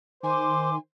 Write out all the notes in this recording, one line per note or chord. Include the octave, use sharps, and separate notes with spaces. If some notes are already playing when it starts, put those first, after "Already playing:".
D#3 C5 G#5 C6 D6